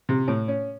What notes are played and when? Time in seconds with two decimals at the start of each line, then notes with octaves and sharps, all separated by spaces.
0.09 C3
0.28 A2
0.48 C#4